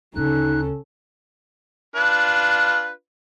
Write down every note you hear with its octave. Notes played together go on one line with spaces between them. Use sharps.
D2 C#3 C#4 D#4 A4 F#6
D4 F4 B4